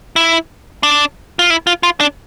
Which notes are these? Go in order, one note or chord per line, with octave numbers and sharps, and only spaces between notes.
E4
D4
F4
E4
F4
F4
D4